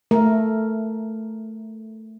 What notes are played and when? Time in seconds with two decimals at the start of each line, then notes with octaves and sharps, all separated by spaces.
0.11 A3 A#4